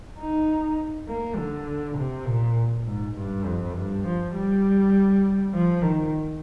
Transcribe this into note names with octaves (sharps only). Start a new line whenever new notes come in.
D#4
A#3
D3
C3
A#2
G#2
G2
F2
G2
F3
G3
F3
D#3